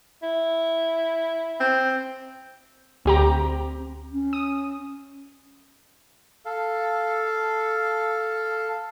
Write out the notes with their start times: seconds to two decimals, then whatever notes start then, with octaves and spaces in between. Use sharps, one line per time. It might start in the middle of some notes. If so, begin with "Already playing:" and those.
0.22 E4
1.60 C4
3.05 D2 C4 G4 A#5
4.12 C#4
4.33 D#6
6.45 A4 F5